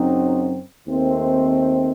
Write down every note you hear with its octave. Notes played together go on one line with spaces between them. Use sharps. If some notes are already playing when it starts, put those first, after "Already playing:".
Already playing: F#2 C#3 F#3 C4 D#4
D#2 D#3 A3 C4